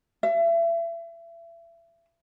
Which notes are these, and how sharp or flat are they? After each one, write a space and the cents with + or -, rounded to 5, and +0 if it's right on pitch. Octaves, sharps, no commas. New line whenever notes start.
E5 +35